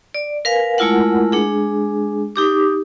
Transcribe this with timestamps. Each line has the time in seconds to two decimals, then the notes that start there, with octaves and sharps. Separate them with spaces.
0.14 D5
0.45 A#4 B4 F5 G#5
0.78 G#3 A3 E4 F4 A#4 F#5
1.32 G#3 D4 G#4
2.36 D#4 G4 D6